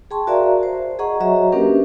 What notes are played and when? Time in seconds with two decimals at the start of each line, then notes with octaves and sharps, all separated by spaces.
0.11 G#4 G5 A5 C6 C#6
0.27 F#4 A#4 D5 E5 F5 A#5
0.63 C5
0.99 G#4 D#5 F#5 A#5 C#6
1.20 F#3 F#4 C#5 D#5 E5 A#5
1.52 A#3 C#4 D4 G4 A#4 B4